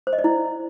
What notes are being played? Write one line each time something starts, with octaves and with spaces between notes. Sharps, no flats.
C5
D#5
D5
E4